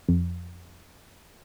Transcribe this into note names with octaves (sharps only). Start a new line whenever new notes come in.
F2